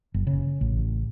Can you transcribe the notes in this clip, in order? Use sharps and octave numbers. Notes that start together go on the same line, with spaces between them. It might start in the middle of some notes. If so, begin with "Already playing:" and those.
F#1
C#3
A1